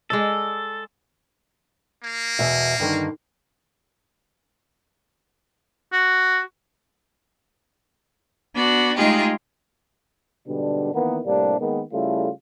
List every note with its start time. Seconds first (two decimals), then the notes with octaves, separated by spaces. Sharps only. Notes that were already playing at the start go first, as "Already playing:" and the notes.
0.10 G#3 A4 D5 D#5
2.03 A#3
2.39 E2 B2 E5
2.80 G2 D3 D#3
5.93 F#4
8.54 B3 D4 F#4
8.97 G#3 A3 D#4 F4 G4 G#4
10.48 G#2 B2 D3 G3 D4
10.94 D#3 E3 A#3 B3
11.26 A2 C3 G3 A#3 D4
11.59 D#3 G#3 A#3 B3
11.93 C#3 G3 A3 E4 F4 A4